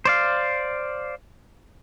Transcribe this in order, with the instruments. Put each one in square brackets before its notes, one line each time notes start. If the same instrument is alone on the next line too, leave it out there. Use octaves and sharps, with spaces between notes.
[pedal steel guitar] C5 D5 F5